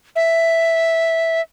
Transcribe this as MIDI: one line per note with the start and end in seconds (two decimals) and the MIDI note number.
0.16 1.41 76